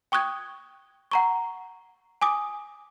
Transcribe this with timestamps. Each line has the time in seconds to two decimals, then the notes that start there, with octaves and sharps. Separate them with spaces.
0.12 G5 C#6 D#6 F#6 G#6
1.11 F#5 A#5 C#6
2.22 G#5 D6 D#6